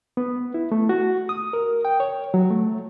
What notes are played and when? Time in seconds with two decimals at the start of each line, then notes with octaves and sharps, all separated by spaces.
0.17 B3
0.54 E4
0.72 A3
0.89 F#4
1.29 D#6
1.53 A#4
1.85 G5
2.00 C#5
2.34 F#3
2.51 A3